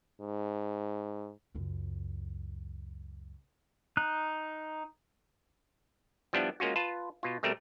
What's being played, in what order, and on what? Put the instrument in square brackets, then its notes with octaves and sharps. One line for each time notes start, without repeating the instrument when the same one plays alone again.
[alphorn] G#2
[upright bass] C#2 F#2
[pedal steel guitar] D#4 F#6
[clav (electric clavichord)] F3 G3 B3 D4 E4
G#3 A#3 C#4 F4 F#4
F4 B4 A5
B2 F4
B2 G3 A3 C4 A#4